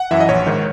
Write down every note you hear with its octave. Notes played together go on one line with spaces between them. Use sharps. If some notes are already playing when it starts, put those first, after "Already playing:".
Already playing: F#5
F#2 E3 E5
D#5
A#1 C#5
G#2 D#3